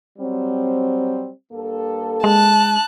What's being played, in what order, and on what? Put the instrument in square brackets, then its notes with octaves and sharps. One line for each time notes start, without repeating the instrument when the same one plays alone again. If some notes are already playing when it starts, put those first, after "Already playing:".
[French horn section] F#3 G3 C4
G2 A#3 A4
[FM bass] G#3 [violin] A5 F#6